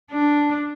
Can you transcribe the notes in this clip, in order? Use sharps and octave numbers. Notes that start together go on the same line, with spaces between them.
D4